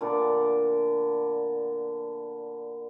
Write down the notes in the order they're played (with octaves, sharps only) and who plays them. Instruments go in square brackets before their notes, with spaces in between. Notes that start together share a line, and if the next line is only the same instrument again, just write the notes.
[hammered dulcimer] A#2 D3 B3 D5